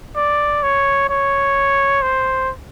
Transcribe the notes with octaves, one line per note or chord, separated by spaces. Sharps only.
D5
C#5
C#5
C5